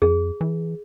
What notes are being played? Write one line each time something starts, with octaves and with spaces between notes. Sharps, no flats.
F2 G#4
E3